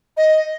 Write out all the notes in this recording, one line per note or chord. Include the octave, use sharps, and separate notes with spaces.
D#5